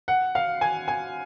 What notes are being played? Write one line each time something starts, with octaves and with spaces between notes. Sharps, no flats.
F#5
F5
G#5
G#5